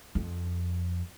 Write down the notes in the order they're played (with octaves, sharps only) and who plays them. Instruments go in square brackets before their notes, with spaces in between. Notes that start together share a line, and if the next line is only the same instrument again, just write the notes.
[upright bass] F2